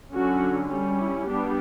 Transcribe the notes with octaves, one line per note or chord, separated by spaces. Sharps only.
D3 F#3 C#4 F#4
G3 C#4
E4
G3 B3 D4 G4